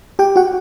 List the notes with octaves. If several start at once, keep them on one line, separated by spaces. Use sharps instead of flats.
G4 G5
F#4 F#5